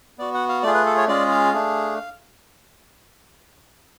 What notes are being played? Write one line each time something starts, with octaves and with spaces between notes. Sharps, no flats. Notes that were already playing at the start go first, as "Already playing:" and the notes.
B3 F#4 D5
F#5
F5
A3 F4 G#4 D5
B4
A4
C#5
G#3 C#4 F4 G#4 D5
F5
A3 D4 G#4